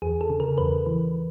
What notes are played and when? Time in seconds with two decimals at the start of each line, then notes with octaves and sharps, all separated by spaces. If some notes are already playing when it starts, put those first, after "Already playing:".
0.02 E2 G#4
0.21 A4
0.30 C#3
0.40 A#4
0.58 E2 B4
0.86 E3